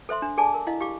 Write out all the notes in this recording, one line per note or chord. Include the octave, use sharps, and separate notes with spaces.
A4 C5 E5 C6
D4
G#4 A4 D5 G#5 A5 D6
A#4
E4 D#5 F5
G4 F5 D6